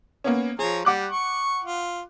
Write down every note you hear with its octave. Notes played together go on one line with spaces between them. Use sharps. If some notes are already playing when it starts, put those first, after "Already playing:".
A#3 B3 C#4
F3 G#4 C#5 A#5
G3 F#5 D6 F#6
C#6
F4